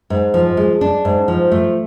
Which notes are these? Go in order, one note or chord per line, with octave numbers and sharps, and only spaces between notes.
G#2
F3
G#3
D4
G#2
F3
A3